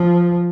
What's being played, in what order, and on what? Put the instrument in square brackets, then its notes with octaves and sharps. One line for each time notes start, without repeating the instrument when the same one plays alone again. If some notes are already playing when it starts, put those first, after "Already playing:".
Already playing: [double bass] F3